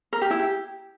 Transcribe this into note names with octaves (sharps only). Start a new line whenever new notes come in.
A#4
G4
E4
G4